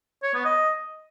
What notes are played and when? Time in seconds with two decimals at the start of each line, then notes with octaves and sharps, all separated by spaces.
0.23 C#5
0.34 B3
0.45 D#5